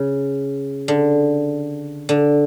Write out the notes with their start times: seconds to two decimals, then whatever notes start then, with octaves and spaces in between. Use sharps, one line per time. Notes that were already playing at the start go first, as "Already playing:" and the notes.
Already playing: C#3
0.88 D3
2.09 D3